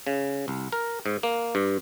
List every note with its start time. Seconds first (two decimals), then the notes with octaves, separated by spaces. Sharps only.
0.07 C#3
0.48 C2
0.72 A#4
1.06 G#2
1.23 A#3
1.55 G2